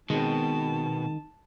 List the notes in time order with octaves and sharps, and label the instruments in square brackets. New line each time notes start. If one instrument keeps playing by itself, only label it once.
[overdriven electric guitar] B2 [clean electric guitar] D#3 [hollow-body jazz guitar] G#3 C4 [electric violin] A5